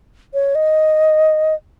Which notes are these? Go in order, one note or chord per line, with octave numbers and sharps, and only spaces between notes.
C#5
D#5